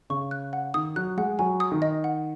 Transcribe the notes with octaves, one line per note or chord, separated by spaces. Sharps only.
C#3 C#6
F#6
F#5
D#3 D#6
F#3 F#6
G#3 F#5
F#3 G#5
D#6
D#3
D#5
F#5